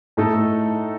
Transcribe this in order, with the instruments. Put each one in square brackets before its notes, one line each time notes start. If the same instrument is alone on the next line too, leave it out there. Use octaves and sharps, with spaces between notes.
[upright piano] A2 A3 D#4 A4